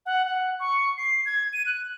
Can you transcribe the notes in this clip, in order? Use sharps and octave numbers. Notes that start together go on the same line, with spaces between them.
F#5
F#5
C#6
C7
G#6
D#7
F#6